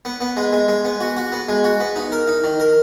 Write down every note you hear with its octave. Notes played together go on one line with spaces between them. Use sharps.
B3
B3
G#3
G#3
G#3
B3
F#4
F#4
B3
G#3
F#4
B3
D#4
A#4
D#4
D#3
A#4